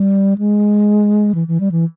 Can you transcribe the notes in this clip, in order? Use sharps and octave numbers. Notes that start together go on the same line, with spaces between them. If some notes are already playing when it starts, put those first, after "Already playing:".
Already playing: G3
G#3
E3
E3
G3
E3